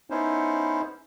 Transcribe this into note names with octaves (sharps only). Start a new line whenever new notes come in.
B3 C#4 D#4 E4 C5